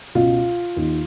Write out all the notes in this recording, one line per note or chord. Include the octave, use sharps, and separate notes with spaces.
C#2 B2 F4
D#2 D#3